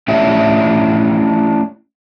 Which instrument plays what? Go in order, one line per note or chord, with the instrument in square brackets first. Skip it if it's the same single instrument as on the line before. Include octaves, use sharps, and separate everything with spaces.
[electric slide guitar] A3 C#4 D4 E4 G4 E5